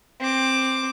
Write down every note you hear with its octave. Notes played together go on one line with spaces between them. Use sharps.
C4 D6